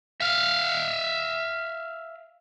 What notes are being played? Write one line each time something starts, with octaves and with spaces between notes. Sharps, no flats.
E5 F5